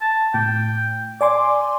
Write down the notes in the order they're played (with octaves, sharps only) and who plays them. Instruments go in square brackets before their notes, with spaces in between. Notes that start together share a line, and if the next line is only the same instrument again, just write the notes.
[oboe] A5
[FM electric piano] A2 [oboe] G5
[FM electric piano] D5 G#5 C6 [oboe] D6